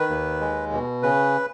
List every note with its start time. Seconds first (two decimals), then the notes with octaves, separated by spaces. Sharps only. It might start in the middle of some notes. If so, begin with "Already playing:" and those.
Already playing: D#3 B4
0.10 D#2
0.41 G#3
0.72 B2
1.03 C#3 B4